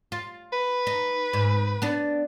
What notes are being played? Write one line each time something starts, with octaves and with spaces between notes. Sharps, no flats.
F4
B4
D#4
G#2
B3 D4